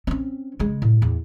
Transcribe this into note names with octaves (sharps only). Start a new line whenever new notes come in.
C4 C#4
C#3 G#3
A2
E2